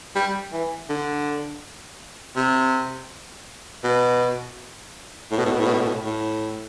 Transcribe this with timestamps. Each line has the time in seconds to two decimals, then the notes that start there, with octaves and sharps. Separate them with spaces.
0.15 G3
0.52 E3
0.89 D3
2.36 C3
3.84 B2
5.31 A2
5.38 B2
5.45 A2
5.52 B2
5.60 A2
5.66 B2
5.73 A2
5.81 B2
5.87 A2
6.05 A2